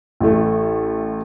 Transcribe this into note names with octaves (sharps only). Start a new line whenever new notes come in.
A1 A3